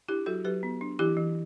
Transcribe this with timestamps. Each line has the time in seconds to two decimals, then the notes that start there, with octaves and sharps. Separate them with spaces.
0.08 D4 E4 G4
0.26 F#3 F#4 A4
0.45 F#3 G4 B4
0.63 B3
0.81 D4
0.99 E3 E4 G4
1.17 E3